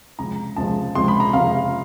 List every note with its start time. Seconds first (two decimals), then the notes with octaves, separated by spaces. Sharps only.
0.19 C#2 C3 F3 G#3 A#5
0.56 C#2 C3 F3 G#3 A5
0.95 C#2 C3 F3 G#3 C6
1.08 B5
1.20 A#5
1.33 C#2 C3 F3 G#3 F5